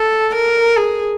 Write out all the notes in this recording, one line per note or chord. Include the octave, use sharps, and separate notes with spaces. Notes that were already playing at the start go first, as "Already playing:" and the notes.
Already playing: A4
A#4
G#4